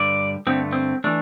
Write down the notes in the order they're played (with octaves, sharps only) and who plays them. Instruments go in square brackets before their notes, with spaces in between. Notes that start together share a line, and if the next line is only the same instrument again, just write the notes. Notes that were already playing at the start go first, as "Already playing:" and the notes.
Already playing: [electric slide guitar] G2 D3 G3 D5
G2 D3 A3 C4
C4
E3 A3 D4